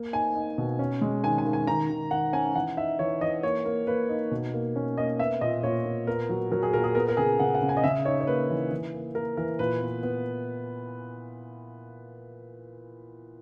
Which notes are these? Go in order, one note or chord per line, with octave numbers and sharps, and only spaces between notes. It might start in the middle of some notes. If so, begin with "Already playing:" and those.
Already playing: A#3
D#4 G#5
D#4
B2
C#4
G#3
D#3 G#5
G#5
D#3
G#5
D#3 A#5
D#3
D#3 F#5
C#4 G#5
E3 F#5
D#4 E5
E3 C#5
E3 D#5
A#3 C#5
A#3
A#3 B4
D#4
B2
A#3
C#4
A#3 D#5
B3 E5
A#2 D#5
A#2 C#5
A#2
B3 A#4
F#3
F#3 A#4
G#4
A#2 A#4
G#4
B3 A#4
A#4
C#3 G#4
C#3 F#5
F#5
C#3
G#5
D#5
C#3 E5
D#4 C#5
C#5
A#3 B4
E3
E3
A#3
A#3 A#4
E3 A#4
A#2 B4
B3
B3